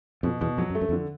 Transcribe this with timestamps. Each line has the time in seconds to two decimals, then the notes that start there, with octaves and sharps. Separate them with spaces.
0.23 F2 B2
0.41 E2 B2
0.57 F2 F#3
0.70 F#2
0.75 A3
0.81 F#2
0.89 F2
0.92 D3